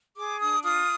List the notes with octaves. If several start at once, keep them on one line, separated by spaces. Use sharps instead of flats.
G#4 D6
D4 D#6
F4 D#6